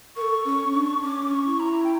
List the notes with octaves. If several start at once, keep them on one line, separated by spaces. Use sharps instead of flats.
A#4 C#6
A4
C#4
D4
C#4 D6
C#6
E4
A#5
G5